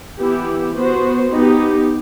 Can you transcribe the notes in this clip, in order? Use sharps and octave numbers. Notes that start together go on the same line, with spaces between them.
E3 B3 E4 G4
B3 F#4 C5
B3 D#4 G4